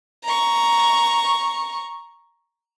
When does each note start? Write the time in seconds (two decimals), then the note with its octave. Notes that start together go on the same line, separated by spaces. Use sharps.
0.24 A#5 C#6